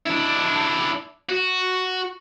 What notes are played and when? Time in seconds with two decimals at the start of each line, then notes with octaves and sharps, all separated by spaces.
0.06 D4 E4
1.29 F#4